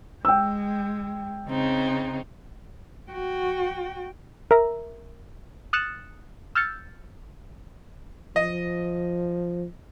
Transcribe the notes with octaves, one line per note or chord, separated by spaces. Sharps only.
G#3 G5 E6
C#3 C4 D#4
F#4 G5
A#4 E5 A#5
D#6 F6 F#6 A6 C#7 E7
E6 F6 G6 A6 C#7
F3 D#5